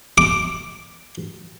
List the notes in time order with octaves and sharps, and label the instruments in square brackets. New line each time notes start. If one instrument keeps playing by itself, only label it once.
[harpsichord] D6